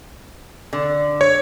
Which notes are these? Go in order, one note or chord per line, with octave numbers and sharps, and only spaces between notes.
D3
C#5